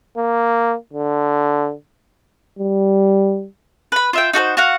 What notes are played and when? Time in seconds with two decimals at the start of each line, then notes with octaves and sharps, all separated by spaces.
0.17 A#3
0.93 D3
2.59 G3
3.92 B4 B5
4.13 F4 E5 G5
4.33 D#4 F#4 A4 C5
4.57 F#4 F5 F#5